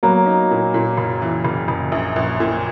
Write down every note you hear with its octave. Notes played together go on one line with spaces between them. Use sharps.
F#3 A#3 B3
D#4
A#2
A#2
F#1
E3
F#1
F#1
A#1
A#1
A#2